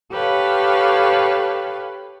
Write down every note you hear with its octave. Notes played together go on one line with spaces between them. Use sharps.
G4 A4 B4 C#5 F5